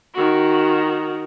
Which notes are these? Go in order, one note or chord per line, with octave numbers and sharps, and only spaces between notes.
D#3 F#4